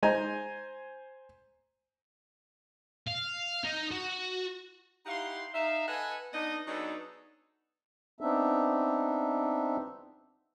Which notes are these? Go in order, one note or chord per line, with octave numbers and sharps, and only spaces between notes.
G#3 D#4 C5 G#5 A#5
F5
D#4
F#4
D#4 E4 G4 F5 F#5 C6
D#4 E5 F5
A4 B4 D#5 F#5 G#5
B3 D4 D#4 D#5
F#3 B3 D4 D#4 G#4 A4
B3 C4 D4 D#4 E5